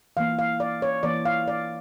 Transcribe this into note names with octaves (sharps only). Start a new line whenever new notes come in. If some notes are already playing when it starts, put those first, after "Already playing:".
E3 A#3 F5
F5
D5
C#5
E3 A#3 D5
F5
D5